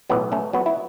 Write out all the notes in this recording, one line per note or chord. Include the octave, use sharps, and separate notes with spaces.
B1 A2 E3 F#3 B3
A3 C#4
F#3 B3
E4